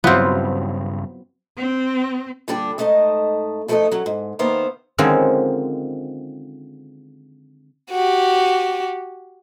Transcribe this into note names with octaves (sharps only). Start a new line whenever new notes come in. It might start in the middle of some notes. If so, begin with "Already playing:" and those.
G2 C#3 F#3 B3 C4 E4 F4
C4
A#2 D3 G3 D4 G4
G#2 A3 D#4 D#5 A5
F3 A3 B3 D#4 A4 D#5
F#3 C#4
G#2
D#3 A#3 B3 C5 E5 F5
D3 D#3 F3 G#3 C4 C#4
F#4 G4